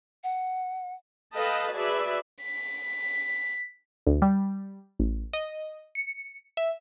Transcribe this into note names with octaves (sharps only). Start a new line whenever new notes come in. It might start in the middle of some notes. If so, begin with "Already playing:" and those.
F#5
A4 B4 D#5 F5 G5 A5
F#4 G#4 B4 D5 E5
B6
D2
G3
A1
D#5
C#7
E5